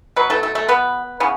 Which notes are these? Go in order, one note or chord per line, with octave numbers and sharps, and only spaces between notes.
B2 F#3 B4
A3 A4
A3 A4
A3 A4
B3 B4
C#3 E3 B3